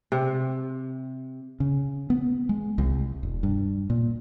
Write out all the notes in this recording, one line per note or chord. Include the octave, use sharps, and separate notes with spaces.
C3
C#3
B3
G#3
C2
E1
G2
A#2